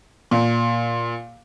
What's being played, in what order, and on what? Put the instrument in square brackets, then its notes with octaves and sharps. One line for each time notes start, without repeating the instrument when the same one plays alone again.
[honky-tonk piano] A#2